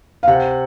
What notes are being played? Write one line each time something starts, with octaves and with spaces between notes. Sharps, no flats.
F5
C3 F#5